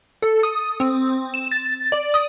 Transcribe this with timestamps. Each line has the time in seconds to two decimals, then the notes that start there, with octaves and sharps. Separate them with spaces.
0.22 A4
0.43 D#6
0.80 C4
1.34 E7
1.52 A6
1.92 D5
2.14 D#6